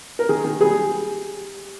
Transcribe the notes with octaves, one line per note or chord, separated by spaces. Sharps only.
A#4
D#3 G#4
D#3
G3 G#4